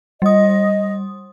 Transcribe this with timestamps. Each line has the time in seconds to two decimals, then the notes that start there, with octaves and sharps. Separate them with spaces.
0.22 G3 D#5 D#6